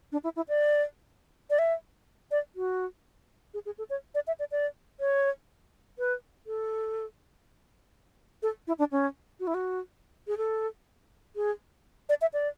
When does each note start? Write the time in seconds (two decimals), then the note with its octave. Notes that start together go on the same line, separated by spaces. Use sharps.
0.12 D4
0.24 E4
0.36 E4
0.48 D5
1.50 D5
1.59 E5
2.31 D5
2.56 F#4
3.54 G#4
3.66 G#4
3.78 A4
3.90 C#5
4.15 D5
4.27 E5
4.39 D5
4.51 D5
5.00 C#5
5.99 B4
6.47 A4
8.43 A4
8.67 E4
8.79 D4
8.92 C#4
9.40 F#4
9.47 E4
9.54 F#4
10.27 G#4
10.37 A4
11.36 G#4
12.09 D5
12.21 E5
12.33 D5